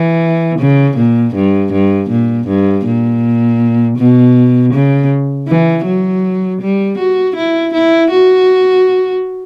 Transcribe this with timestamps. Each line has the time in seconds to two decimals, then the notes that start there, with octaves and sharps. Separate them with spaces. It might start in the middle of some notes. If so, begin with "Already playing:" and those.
Already playing: E3
0.59 C#3
0.97 A#2
1.35 G2
1.72 G2
2.10 A#2
2.48 G2
2.86 A#2
3.98 B2
4.73 C#3
5.48 E3
5.86 F#3
6.62 G3
6.98 F#4
7.36 E4
7.74 E4
8.11 F#4